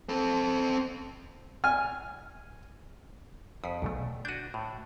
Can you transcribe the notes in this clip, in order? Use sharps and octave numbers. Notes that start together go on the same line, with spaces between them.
C4 A4
G#5 F6
F2 D#6 B6
B1 E2 B2 A3
D4 F#4 G6 D#7
A2